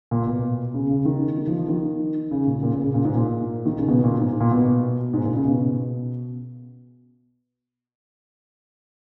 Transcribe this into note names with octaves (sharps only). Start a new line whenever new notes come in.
A#2
B2
C#3
C#3
D#3
D#3
F3
F3
D#3
C#3
A#2
A#2
C#3
C#3
A#2
G#2
A#2
D#3
C#3
B2
A#2
G#2
A#2
B2
G#2
A#2
C#3
B2